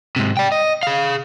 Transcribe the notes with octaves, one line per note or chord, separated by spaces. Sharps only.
G#2 C3
D5 G5
D#5
G#4 F5